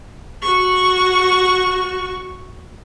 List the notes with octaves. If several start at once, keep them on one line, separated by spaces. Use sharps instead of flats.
F#4 C#6